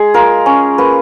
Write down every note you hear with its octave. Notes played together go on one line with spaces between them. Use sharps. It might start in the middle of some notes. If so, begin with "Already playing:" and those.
Already playing: G#3 G#4
F4 A#4
C#4
A#3 B4